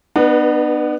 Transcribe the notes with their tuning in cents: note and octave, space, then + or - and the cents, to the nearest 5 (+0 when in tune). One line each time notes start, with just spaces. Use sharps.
B3 +5 D4 +45 B4 -25